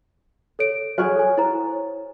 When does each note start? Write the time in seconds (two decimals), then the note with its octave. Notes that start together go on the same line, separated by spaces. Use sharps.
0.59 A4 C#5 D7
0.98 F#4 G#4 C#5 F#5 F6
1.16 A4 G#5
1.38 E4 C5 A#5